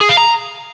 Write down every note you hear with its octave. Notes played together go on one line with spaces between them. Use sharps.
G#4
F5
A#5